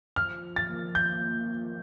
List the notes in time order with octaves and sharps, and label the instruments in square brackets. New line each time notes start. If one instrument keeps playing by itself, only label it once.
[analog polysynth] F3 [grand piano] F6
[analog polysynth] F3
[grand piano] A6
[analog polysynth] A#3
[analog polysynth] F4 [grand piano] G6
[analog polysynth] F3
F3